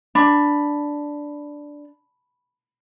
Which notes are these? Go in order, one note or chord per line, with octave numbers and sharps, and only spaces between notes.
D4 B5